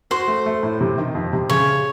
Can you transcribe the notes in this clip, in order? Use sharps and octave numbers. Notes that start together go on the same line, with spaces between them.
F#4 C5
A3
A3
A2
C3
D#3
F2
C3
C#3 C#5